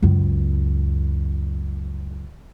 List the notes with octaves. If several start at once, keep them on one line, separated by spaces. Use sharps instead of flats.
C#2 F#2